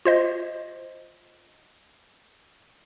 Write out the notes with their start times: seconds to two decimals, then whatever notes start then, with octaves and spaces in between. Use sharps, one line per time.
0.05 F4 C5 D#5